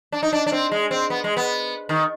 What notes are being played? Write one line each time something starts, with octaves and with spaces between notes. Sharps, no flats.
D4
D#4
D4
D4
C4
G#3
C4
B3
G#3
B3
D#3